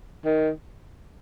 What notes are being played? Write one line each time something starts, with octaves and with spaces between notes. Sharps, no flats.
D#3